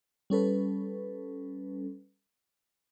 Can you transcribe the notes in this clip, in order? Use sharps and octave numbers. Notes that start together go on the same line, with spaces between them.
G3 C#4 A4 B4